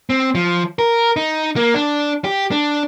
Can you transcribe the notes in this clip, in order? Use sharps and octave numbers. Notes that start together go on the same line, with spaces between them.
C4
F3
A#4
D#4
A#3
D4
G4
D4